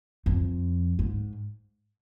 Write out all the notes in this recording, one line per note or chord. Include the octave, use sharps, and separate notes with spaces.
F2
G#2